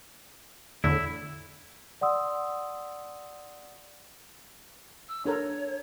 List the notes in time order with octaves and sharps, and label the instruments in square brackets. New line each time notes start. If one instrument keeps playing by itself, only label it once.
[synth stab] E2 A2 D3 [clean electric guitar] E4
[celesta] D5 F#5 C6 D#6 E6
[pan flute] E6
[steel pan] D4 A4 A#4 [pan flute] C#5